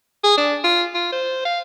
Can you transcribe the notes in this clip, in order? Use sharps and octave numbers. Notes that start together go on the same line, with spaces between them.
G#4
D4
F4
F4
C5
F5